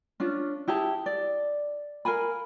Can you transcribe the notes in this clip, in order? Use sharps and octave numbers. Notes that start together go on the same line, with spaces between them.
C#4 D4 F4
E4 G4 G#4 A5
D5
A#4 F5 G#5 B5